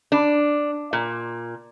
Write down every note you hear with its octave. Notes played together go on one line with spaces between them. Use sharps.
D4
A#2